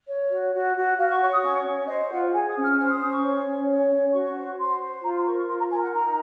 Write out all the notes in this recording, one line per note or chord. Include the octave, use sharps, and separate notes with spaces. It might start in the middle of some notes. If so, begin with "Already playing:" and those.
C#5
F#4
F#4
F#4
F#4 F5
C#6
C#5 C#6
D#6
C#4 C#6
C#4
C5 D#5
F4 F#5
G#4 G#5
D#6
C#4
F6
C5 F6
D#6
C#4 D#6
C#6
C#5
C#4
C#5
C#4
F#4 C#6
C#6
C5
C#6
C5 C6
C5
F4 A#5
C6
A#4 C#6
C#6
F4 C6
A#5
A#4 G#5
F#5
D#4 A#5